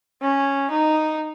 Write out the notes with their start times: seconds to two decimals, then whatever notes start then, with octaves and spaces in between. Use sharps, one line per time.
0.21 C#4
0.71 D#4